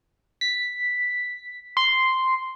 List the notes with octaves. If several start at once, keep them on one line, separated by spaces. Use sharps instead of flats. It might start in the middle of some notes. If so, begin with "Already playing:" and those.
B6
C6